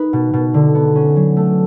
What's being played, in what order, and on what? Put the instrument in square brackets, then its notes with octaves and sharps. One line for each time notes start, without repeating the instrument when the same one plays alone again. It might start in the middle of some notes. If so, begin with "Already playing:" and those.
Already playing: [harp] D#4 B4
B2
B2
D3
B3
C#4
F#3
A3